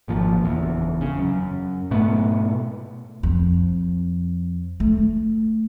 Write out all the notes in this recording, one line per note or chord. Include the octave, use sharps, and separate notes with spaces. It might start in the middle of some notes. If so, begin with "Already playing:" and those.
G#1 A#2 F3
F#1 E2
C#3
F#2
G#2 B2 A3 B3
F2
A3